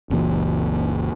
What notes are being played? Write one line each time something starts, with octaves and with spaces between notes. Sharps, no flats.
F#1 C#2 A#2 E3